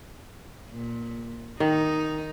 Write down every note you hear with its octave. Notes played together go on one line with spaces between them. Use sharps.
A#2
D#3 D#4